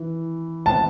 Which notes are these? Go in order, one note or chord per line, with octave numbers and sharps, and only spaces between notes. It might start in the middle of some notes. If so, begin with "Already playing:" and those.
Already playing: E3
A5